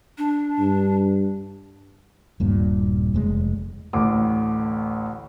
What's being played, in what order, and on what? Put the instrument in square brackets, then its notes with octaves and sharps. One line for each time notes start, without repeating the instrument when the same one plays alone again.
[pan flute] D4
[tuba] G2
[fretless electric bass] D#1 G2 A#2
F1 G#3
[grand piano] A1 D2 D6